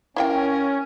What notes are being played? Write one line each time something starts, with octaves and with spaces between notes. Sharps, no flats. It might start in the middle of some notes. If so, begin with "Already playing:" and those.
C#4 E4 F4 A#4 G5